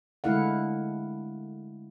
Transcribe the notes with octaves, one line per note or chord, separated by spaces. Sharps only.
D3 G#3 A3 E4 F5 F#5